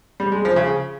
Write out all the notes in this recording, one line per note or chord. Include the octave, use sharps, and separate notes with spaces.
G3
G#3
F3
C#3